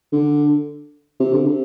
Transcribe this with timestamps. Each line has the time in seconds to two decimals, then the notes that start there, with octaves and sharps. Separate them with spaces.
0.13 D3
1.20 C3
1.33 D3
1.45 C3